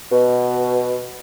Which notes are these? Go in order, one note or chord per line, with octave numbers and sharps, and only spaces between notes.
B2